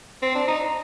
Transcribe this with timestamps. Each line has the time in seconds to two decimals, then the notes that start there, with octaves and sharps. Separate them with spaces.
0.22 C4
0.35 D4
0.48 D#4